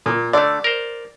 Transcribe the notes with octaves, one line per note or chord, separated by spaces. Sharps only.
A#2
D3 A3 D5
A#4 C5